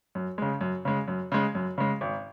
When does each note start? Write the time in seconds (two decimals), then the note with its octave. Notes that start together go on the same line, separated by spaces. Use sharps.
0.15 F#2
0.38 C#3 G#3
0.61 F#2
0.85 C#3 G#3
1.08 F#2
1.32 C#3 G#3
1.55 F#2
1.78 C#3 G#3
2.01 G#1